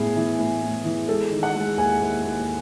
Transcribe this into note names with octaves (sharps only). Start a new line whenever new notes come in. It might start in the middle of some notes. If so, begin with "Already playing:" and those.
Already playing: A2 B3 G#4
E3
A2
A2
E3
G#3 A4
D#3
F#5
G#3
D#2 G#5
D#2
D#2